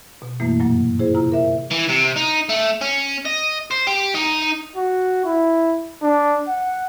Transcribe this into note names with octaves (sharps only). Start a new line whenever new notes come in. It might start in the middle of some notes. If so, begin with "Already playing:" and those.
B2
F#2 B2 E3 A3 A#3 E4
G2 A#2 F#3 A#3
E4 G#4 C5
C3 E4 F4 A#5
A#4 E5
E3
C3
D#4
A3
C#4
D#5
C5
G4
D#4
F#4
E4
D4
F#5